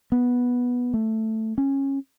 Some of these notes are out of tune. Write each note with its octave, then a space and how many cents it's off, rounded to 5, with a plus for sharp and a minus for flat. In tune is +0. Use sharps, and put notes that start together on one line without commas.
B3 -10
A3 +5
C#4 -15